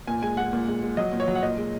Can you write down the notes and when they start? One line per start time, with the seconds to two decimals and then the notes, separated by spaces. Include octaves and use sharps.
0.07 A#2 G#5
0.22 G#3 G#5
0.37 G#3 F#5
0.53 A#2
0.68 G#3
0.82 G#3
0.97 F#3 D#5
1.13 A#2
1.20 C#5
1.28 F#3
1.35 F#5
1.42 A#2 D#5
1.57 G#3